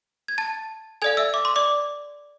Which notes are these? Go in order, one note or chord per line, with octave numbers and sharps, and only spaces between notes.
G#6
A5 A6
A4 D5 F5 G#5 G#6
E5 E6
D6
C6
D5 D6